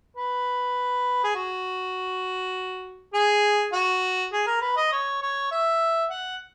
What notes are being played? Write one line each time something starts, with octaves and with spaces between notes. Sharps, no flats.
B4
G#4
F#4
G#4
F#4
G#4
A#4
B4
D#5
C#5
C#5
E5
F#5